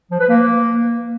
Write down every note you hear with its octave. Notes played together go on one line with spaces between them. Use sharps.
F3
B4
A#3